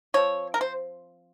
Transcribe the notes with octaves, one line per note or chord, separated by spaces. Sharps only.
F3 C4 C#5
A#4
C5